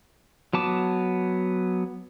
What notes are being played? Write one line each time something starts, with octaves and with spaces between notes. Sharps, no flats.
F#3 B3 A5 D6